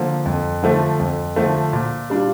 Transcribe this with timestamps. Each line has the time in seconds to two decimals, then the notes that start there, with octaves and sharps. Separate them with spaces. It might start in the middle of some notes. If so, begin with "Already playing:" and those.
Already playing: D3 F3 A#3
0.26 F2
0.63 D3 F3 A3
1.00 F2
1.36 D3 F3 A3
1.73 A#2
2.10 G3 D4 F4